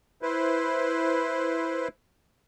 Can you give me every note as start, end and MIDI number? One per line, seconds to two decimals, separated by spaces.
0.22 1.88 64
0.22 1.88 71
0.22 1.88 72